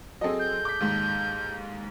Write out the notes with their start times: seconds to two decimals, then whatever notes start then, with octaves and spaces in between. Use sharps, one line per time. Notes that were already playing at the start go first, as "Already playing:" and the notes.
0.21 F#3 C4 G#4 A4 D#5
0.39 G6
0.65 D6 B6
0.80 D#2 G#2